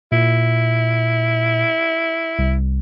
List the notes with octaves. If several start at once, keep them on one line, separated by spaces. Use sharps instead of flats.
A#2 E4
C2